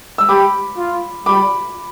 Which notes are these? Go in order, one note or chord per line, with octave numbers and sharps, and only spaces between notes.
E6
G4 B5 D6
F4
G3 B5 D6